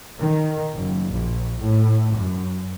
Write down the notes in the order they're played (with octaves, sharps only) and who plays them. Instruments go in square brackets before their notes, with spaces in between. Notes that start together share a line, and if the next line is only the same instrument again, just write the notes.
[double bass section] D#3
F#1
A#1
A2
F#2